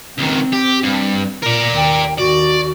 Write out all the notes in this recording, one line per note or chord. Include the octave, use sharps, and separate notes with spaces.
C#2 D#3 C4
G4
G2
A#2 A#4 D5
D#2 G5
D#2 F#4 D5